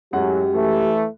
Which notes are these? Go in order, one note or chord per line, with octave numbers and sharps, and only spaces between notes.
F#2 A2 F#3 G#3 G4 F#5
E3 A3